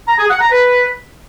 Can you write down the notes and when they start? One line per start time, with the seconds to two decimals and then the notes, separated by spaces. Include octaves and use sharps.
0.08 A#5
0.19 G#4
0.29 F#5
0.40 A#5
0.51 B4